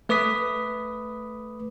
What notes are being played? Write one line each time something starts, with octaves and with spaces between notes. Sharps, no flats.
A3 B4 D6 D#6 B6